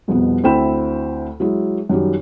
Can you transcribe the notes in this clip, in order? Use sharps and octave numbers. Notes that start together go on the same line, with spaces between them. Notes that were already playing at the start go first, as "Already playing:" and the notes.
C2 F2 B2 B3
D2 C4 E4 G5 B5 E7
F#3 G#3 E4
F#2 D#3 F#3 G3